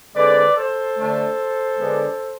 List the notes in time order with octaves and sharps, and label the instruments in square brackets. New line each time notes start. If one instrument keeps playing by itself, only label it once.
[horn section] D3 G#3 C4 B4 D5
A4 C5
D3 A3 D4
D3 G#3 B3 D4